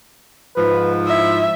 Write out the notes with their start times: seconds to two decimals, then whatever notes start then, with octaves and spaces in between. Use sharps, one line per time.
0.57 G#2 F3 B4
1.07 E4 E5